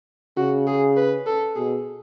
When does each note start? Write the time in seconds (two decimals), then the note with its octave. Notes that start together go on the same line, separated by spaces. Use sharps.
0.37 C#3 F#4
0.67 G#4
0.97 B4
1.26 A4
1.56 B2 G#4